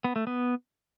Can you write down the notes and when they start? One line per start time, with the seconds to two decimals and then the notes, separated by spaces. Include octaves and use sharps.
0.04 B3
0.16 A3
0.27 B3